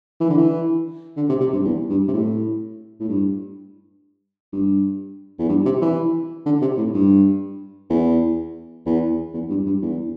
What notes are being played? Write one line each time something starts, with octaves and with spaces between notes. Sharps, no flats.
E3
D3
E3
D3
C3
C3
G2
E2
G2
C3
A2
A2
G2
G2
E2
G2
C3
E3
D3
C3
A2
G2
E2
E2
E2
G2
G2
E2